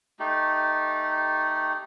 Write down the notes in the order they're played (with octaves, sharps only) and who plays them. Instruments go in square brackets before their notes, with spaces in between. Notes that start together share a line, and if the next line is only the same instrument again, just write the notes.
[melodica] A3 D#4 G4